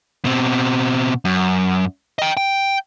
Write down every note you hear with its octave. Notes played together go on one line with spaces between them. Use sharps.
B2 C4
F#2
D#5 G5
G5